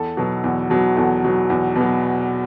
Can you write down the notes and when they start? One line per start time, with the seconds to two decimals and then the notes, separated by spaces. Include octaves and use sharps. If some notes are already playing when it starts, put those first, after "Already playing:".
Already playing: E2 A4
0.17 B2 F#3
0.44 E2
0.70 B2 F#3
0.96 E2 A4
1.24 B2 F#3
1.50 E2
1.76 B2 F#3